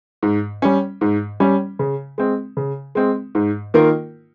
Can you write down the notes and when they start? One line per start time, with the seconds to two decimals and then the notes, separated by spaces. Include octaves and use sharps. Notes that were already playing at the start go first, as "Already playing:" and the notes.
0.23 G#2
0.62 G3 C#4
1.01 G#2
1.40 G3 C#4
1.79 C#3
2.18 G#3 C4
2.57 C#3
2.95 G#3 C4
3.35 G#2
3.74 D#3 A#3 F4 A#4